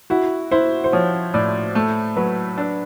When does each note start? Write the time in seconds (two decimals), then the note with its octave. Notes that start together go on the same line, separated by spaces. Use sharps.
0.10 E4 F#4
0.51 E4 C5
0.84 C5
0.92 F3 C#5
1.34 A2 D5
1.75 A3
2.16 F#3 B4
2.58 D4